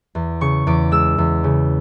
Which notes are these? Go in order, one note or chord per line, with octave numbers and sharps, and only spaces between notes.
E2
C#3 C#6
E2 D6
G#3 E6
E2
C#3